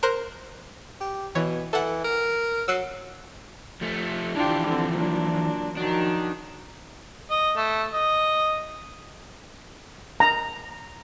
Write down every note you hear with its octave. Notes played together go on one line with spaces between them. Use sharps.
A#4 C5 F#6
G4
B2 E3 C#5
E3 A4 F#5
A#4
F#3 E6 F#6 C7
F3 A3
E3 F3 D4 F4 G4
D3 C4
A#2 F#3 D4
D#3 F3 F#3 D4
D#5
A3
D#5
A#5